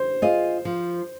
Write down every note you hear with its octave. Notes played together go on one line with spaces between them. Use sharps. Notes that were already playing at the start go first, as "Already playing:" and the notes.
Already playing: C5
F4 G#4 D#5
F3